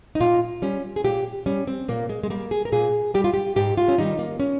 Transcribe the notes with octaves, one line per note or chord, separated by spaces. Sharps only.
D#4
A#2 F4
G3 C#4
G#4
A#2 G4
G3 C#4
C4
A#2 A#3
G#3
G#3
G3 A#3
G#4
A#4
A#2 G#4
G3 G4
F4
G4
G#2 G4
F4
C#4
D#3 G3 D#4
A#3
C#4